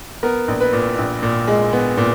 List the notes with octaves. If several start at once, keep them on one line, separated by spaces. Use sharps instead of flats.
B3 A#4
A#1
B4
A#2
A#1
A#2
G#3
B3
A#2